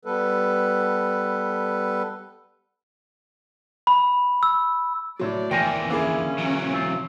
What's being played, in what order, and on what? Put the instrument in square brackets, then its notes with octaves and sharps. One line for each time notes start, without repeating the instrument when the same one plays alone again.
[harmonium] G3 B3 A4 B4
[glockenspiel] B5
E6
[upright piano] A2 F#3 [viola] D5
[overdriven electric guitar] D#2 E3 [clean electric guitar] A#4 C5 G#5 [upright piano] G5
[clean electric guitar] D3 F4 [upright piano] A#3 E4 G#4 [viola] C#4
[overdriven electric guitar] E3 F#3
[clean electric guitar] C4 F4